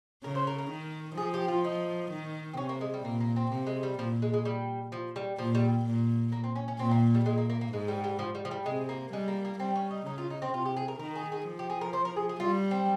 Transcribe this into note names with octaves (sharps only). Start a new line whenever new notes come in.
C#3 A#4
C5
A#4
A#4
D#3
F3 G#4
G4
F4
D#4
D#3
C4
C3 C#4
A#3
G#3
G3
A#2 A#3
A#3
C4
C3 A#3
G#3
G3
A#2 F3
G#3
G#3
G3
F3
G3
A#2 F3
G3
A#2
A#3
C4
C#4
C#4
A#2 C4
A#3
G3
A#2 G#3
A#3
A#3
A#3
G#2 G#3
G3
G3
F3
G3
F3
G3
C3 G#3
A#3
G3 G#3
A#3
A#3
G3 C4
C#4
D#4
C#3 D#4
F4
D#4
C4
C3 F4
G4
G#4
A#4
D#3 A#4
G#4
G#4
F3
G4
G#4
A#4
C5
A#4
G#4
G#4
G3 F4
C4